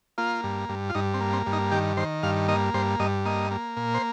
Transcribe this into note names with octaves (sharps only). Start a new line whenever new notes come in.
A#3 F4
G2
G2
F4
G2 D#4
C4
A#3
C4
G2
D#4
D#3 G4
D#3 C5
G2 F5
A#3 D#5
G2 C5
G2 D#5
A#3 D#5
A#3
A#2
C5